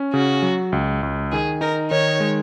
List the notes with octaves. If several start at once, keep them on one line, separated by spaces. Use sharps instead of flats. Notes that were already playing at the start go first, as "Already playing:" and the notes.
Already playing: C#4
C#3 F#4
F#3
C#2
C#2
D#3 G#4
D#4 A#4
D#3 C#5
G#3